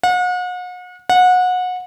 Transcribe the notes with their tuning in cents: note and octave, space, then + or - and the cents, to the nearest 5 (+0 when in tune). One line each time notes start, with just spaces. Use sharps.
F#5 -40
F#5 -25